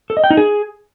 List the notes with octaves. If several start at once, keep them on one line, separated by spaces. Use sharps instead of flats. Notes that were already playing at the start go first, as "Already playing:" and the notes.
A4
D#5
G5
D#4
G#4